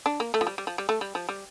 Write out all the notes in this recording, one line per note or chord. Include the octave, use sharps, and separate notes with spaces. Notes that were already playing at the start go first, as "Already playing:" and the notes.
D4
A#3
A3
F3
G3
G3
F3
G3
A3
G3
F3
G3